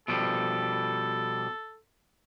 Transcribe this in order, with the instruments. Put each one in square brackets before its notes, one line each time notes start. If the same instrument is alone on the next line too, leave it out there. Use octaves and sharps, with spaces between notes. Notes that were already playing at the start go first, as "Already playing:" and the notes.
[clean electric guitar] B2 F3 G3 [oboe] A4